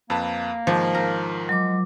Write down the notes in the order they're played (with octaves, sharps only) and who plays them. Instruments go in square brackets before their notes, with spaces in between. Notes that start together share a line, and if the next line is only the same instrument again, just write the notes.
[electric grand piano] F2 B4 A5 [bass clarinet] A#3
[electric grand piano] G#2 D#3 [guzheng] F3
[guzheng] A#4
[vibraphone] F#3 D6 [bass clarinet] G#3